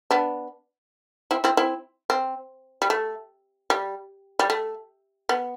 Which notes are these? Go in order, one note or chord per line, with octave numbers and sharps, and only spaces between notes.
B3 D4
C4 E4
C4 E4
C4 E4
C4
G3
A3
G3
G3
A3
B3